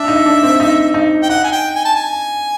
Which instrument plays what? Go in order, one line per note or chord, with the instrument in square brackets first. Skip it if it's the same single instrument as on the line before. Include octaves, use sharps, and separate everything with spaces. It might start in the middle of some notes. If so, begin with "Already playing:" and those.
Already playing: [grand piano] D4 [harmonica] E5
[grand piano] D#4
D4
C4
D#4
D#4
[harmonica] G5
[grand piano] D#4 [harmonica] F#5
[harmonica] G#5
G5
G#5
A5
G#5